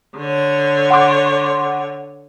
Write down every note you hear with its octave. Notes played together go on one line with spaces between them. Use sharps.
D3 C#5
F#5 C6 D6